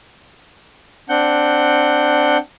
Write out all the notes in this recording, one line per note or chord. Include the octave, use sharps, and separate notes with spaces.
C4 D4 F#5 G6